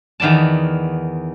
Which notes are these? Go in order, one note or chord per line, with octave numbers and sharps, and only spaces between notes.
E2 D#3 B3 D5 A5